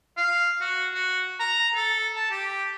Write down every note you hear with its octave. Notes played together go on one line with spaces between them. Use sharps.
F5
F#4
F#4
A#5
A4
A5
G4